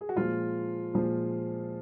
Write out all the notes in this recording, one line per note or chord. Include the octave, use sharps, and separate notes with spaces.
G#4
F#4
A#2 F3 G#3 F4
A#2 F3 G#3